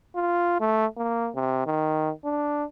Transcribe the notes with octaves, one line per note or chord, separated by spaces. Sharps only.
F4
A3
A#3
C3
D#3
D4